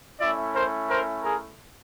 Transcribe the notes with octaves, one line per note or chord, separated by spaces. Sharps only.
A3 C#4 E4 D5 E5
A#4 C5
A#4 C5
G#4 A#4